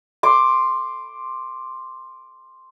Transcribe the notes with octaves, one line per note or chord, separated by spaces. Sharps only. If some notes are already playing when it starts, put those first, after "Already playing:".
C6 D6